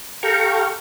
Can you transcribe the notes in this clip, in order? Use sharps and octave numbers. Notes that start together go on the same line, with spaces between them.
G4 A4 F5 G5 A#5 C#6